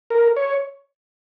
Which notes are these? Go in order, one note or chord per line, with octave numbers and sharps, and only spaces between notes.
A#4
C#5